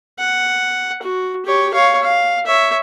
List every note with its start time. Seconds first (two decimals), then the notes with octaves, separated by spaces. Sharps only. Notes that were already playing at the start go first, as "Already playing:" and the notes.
0.19 F#5
1.03 F#4
1.45 G4 C#5
1.74 C#5 F5
2.02 F5
2.46 C#5 E5